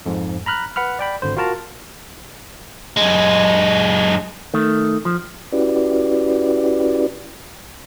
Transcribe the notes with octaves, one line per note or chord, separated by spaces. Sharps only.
F2 G#2
A#5 B5 F6 F#6
B4 F#5 B5 F6
D5 G5 B5
G#1 D3 C5
F4 F#4 A#4 A5 A#5
F#2 G#3
D#3 A3
F3
C#4 E4 F#4 G4 B4 D5